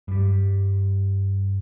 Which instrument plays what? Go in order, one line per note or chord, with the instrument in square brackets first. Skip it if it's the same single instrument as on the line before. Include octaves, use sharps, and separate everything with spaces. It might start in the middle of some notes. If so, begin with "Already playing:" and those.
[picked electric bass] G2 G3